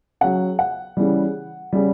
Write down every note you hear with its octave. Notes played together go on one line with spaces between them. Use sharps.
C#3 F#3 F#5
F#5
C#3 E3 G3
C#3 G3